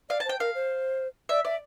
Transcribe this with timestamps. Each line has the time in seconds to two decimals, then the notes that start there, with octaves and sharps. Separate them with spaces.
0.09 D5 F5
0.20 A5
0.25 C5 G5
0.40 A#4 F5
0.55 C5
1.29 D5 E5
1.45 D5 E5